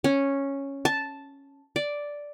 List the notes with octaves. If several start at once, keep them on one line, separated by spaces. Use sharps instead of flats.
C#4
A5
D5